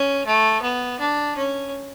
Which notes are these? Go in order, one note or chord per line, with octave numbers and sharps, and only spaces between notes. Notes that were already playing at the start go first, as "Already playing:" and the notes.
Already playing: C#4
A3
B3
D4
C#4